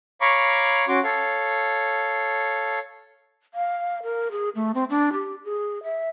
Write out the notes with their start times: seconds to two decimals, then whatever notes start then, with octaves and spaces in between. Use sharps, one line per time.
0.21 C#5 F5 A#5 B5 C#6 D6
0.88 C#4 F#4 C6 D6
1.04 A4 C#5 F5
3.54 F5
4.03 A#4
4.31 G#4
4.55 A3
4.75 C4
4.90 D4
5.13 G4
5.44 G#4
5.83 E5